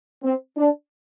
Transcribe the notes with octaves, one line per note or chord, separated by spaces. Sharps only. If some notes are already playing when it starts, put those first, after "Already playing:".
C4
D4